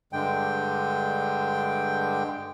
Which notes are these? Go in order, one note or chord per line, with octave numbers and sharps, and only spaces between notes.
G2 D3 G#3 G5